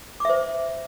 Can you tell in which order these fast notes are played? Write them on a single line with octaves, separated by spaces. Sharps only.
D6 E5 C5